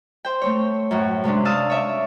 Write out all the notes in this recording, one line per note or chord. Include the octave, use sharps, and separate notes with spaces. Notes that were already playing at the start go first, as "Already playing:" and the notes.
C5 G5
A3 C4 C#5
F#2 A2 F#4
C3 G#3 C#4 D4
F5 A5 D#6 E6
C#5 E5 D6